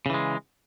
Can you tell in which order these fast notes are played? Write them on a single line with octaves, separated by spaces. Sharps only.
C#3 E3 G#3